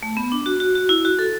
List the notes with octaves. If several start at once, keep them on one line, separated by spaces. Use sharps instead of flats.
A3
B3
D4
F#4
F#4
F#4
E4
F#4
A4